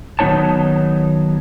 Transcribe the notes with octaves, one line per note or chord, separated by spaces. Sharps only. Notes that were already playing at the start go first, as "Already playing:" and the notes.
D#3 F#3 B3 D#4 C#5 A5